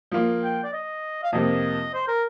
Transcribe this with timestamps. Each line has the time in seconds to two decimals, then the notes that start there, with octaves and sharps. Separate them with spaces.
0.12 F3 A#3 F4
0.42 G5
0.63 D5
0.73 D#5
1.23 F5
1.32 F2 C3 F3 A#3 D#5
1.94 C5
2.08 A#4